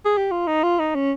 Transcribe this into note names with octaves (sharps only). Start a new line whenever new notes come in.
G#4
G4
F4
D#4
F4
D#4
C#4